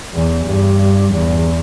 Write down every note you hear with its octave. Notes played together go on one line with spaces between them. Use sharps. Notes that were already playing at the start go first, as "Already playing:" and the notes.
E2
G2
E2